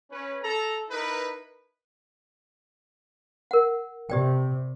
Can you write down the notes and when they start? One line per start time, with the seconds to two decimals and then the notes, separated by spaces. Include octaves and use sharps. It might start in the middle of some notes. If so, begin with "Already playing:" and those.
0.11 C#4 B4
0.42 A4 A#5
0.90 D#4 E4 A#4 B4
3.51 A#4 F#5
4.10 C3 G4 D5 G5